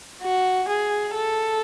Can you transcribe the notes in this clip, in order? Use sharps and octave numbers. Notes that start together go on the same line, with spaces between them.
F#4
G#4
A4